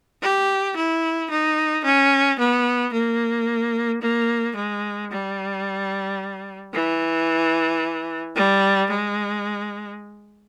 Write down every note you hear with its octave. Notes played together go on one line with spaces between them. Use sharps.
G4
E4
D#4
C#4
B3
A#3
A#3
G#3
G3
E3
G3
G#3